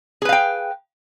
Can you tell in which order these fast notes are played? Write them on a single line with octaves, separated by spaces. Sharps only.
G#4 B4 F5 G5